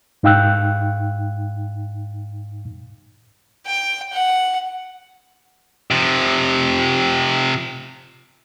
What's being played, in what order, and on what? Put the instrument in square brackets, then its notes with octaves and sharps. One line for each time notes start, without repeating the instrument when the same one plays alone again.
[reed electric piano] G#2 D#4 F5 G5 E6 F#6
[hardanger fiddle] G5
F#5
[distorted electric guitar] C3 F3